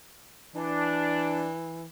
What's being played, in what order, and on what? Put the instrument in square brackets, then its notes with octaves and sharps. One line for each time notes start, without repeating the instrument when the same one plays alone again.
[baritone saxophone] E3 [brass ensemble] D4